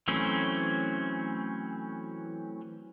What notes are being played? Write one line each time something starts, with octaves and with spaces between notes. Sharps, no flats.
E3 F#3 A3 C4 C#4